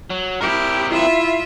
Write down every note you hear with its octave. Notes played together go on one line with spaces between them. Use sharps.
F#3
C4 E4 G4 A#4
E4 F4 E5